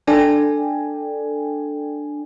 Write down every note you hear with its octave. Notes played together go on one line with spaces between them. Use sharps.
D4 A4 D5 G5 G#5